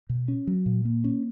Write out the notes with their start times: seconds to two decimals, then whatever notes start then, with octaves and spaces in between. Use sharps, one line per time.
0.09 B2
0.28 C#4
0.47 F#3
0.66 A#2
0.85 A#3
1.04 C#4